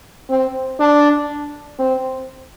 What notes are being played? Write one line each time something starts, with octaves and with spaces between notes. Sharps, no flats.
C4
D4
C4